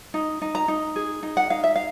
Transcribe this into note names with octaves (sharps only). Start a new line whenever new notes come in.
D#4
D#4
A#5
D#4
G#4
D#4
F#5
D#4 F5
E5
F5